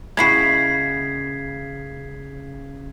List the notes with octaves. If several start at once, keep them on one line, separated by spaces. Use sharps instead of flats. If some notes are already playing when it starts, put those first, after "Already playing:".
C#3 G#3 A#3 E4 F#4 G#6 B6 C7